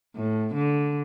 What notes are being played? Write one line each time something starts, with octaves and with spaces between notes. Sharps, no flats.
A2
D3